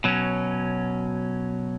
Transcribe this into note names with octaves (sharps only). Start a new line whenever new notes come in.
B2 F#3 C#4